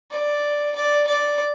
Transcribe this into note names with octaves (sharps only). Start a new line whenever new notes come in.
D5
D5
D5